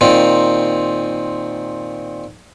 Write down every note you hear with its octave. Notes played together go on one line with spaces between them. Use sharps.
A#2 D#3 C4